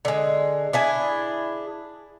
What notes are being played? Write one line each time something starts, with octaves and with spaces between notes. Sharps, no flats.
D3 G#3
D4 E4 G#4